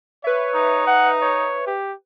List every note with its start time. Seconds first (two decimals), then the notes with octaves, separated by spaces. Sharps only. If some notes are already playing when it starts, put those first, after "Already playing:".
0.24 B4 C#5 E5
0.55 D#4
0.87 F#5
1.22 C#5
1.66 G4